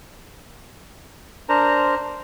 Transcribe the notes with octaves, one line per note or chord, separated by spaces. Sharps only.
D4 A#4 C5 A#5